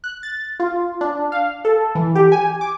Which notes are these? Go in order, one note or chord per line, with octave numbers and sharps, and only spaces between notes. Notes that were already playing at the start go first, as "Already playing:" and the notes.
F#6
A6
F4
D4
F5
A4
E3
G4
G#5
D6